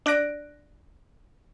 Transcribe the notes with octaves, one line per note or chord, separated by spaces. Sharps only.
D4 D5 F#6 A#6 D7